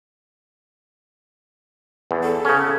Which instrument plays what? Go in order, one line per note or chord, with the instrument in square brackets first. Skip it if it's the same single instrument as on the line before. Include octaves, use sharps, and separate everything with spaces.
[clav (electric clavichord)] E2
[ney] A4
[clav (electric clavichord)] C#3 C#4